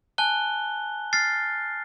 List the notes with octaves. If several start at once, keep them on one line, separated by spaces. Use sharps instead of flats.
G#5 A5 F#6 G7
F6 A6 C7